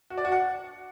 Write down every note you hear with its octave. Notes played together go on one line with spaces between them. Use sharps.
F#4
D5
F#4
F#5